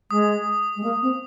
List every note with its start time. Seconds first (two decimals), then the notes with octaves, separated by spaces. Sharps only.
0.11 G#3 D#6
0.76 G#3
0.83 A#3
1.02 C4